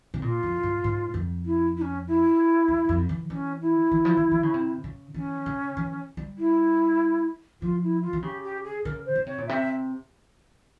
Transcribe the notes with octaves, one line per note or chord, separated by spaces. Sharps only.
C3
A#2 F4
F2
G2
G#2
F2
E4
E4
C#4
E4
E2
F2
E3
E3 C#4
E4
E3
F3
E3
E3
C#3
C3
C#3
E3 C#4
C#3
E3
G3
E4
F3 F4
E4
F4
E3
C#3 G4
G4
G#4
C#3 A#4
C5
C#3
C3 C#5
A#2
C3 E5